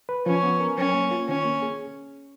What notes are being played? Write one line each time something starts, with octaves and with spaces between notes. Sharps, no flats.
B4
F3 C#4
B3
A#4
F#3 C#4
A#3
F4
D#3 C#4
A#3
G#4